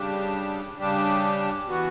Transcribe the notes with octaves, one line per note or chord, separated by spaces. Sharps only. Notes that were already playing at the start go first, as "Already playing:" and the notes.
Already playing: C#3 G3 D4 G4
C#3 G3 D4 G4
E3 B3 F#4